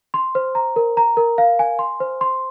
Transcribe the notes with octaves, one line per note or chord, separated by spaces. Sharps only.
C6
C5
A#5
A#4
A#5
A#4
F5
G#5
C6
C5
C6